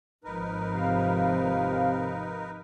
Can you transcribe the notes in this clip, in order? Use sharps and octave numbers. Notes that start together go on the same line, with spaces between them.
G#1 F3 D#4 A#4 B4
C3 F5